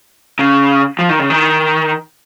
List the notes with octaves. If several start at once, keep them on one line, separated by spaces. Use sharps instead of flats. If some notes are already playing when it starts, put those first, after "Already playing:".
C#3
F3
D#3
C#3
D#3